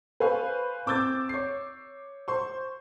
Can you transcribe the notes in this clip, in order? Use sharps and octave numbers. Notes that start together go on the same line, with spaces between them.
B4 C5 F5 G#5 C#6
C4 D6 E6 G6 A6
C#5 C7
C5 C6 C#6